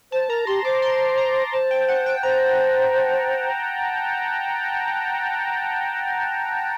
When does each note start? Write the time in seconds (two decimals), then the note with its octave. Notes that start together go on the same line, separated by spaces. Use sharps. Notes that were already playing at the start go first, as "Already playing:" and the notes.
0.12 C5 A5
0.29 A#4 A#5
0.47 G4 C6
0.64 C5 D6
0.82 C6
1.18 A#5
1.53 C5 A5
1.71 G5
1.88 F#5
2.06 G5
2.23 C5 A#5